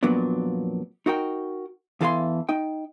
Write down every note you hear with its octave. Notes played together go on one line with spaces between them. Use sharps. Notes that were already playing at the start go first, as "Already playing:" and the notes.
F2 A#2 F#3 A#3 B3 D4
D#4 F#4 A#4 G5
E2 E3 A4 F5 G#5 C6
D#4 G5